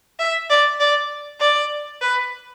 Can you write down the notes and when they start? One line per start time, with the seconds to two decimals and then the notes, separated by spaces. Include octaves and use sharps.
0.19 E5
0.50 D5
0.80 D5
1.40 D5
2.01 B4